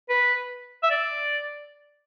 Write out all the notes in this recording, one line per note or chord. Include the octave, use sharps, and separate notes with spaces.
B4
E5
D5